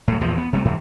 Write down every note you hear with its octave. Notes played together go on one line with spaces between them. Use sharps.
A2 F#3
A#1 E2 A2 F3
B3
C3 G3 A3
G#2 C3 E3